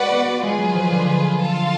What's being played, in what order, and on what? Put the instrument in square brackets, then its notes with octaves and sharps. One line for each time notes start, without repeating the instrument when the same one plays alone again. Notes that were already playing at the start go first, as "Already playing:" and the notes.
Already playing: [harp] G#3 [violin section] F#4 B4 D5 F#5
[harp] B3
B3
[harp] G#3 [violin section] F4 G#4 B4
[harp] F#3
F3
D3
[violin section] F4 A4 F5 A5